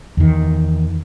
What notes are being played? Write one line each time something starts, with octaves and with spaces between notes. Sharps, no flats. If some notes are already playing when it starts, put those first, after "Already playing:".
E2 D#3